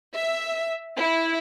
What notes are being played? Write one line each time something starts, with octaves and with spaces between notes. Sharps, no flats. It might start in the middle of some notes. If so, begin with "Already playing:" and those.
E5
E4